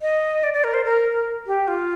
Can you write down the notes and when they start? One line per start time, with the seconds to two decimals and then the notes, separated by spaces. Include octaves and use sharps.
0.02 D#5
0.43 D5
0.53 D5
0.64 A#4
0.74 C5
0.85 A#4
1.47 G4
1.68 F4